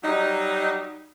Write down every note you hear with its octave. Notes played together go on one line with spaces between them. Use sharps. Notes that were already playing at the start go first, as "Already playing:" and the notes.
F#3 G3 D#4